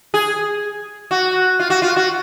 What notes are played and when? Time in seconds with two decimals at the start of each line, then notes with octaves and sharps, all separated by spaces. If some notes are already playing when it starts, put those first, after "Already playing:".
0.14 G#4
1.11 F#4
1.60 F4
1.70 F#4
1.82 F4
1.96 F#4